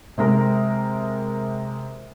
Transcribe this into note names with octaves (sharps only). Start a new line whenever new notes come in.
C3 G#3 A#4